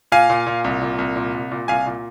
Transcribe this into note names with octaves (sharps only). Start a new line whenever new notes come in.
A#2 F5 G#5
A#2
A#2
C2
A#2
C2
A#2
C2
A#2
C2 F5 G#5
A#2